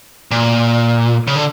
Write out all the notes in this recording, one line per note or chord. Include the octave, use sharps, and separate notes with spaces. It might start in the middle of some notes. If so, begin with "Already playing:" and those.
A#2
C#3
D3